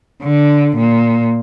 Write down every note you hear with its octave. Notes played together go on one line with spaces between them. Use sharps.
D3
A#2